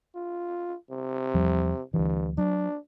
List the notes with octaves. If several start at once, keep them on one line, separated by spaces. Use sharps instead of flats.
F4
C3
E2 F3 G3
D2 G2 E3
F#3 D4